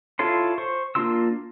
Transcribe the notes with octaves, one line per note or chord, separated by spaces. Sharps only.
E4 F4 A4 C#5 C6
C5 C#6
A#3 D4 F4 C6 E6